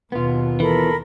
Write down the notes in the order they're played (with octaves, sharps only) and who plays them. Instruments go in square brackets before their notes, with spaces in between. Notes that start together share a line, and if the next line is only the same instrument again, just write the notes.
[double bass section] D#2 B2 [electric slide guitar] B3 F4
[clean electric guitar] E3 [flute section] A4 A#4 B5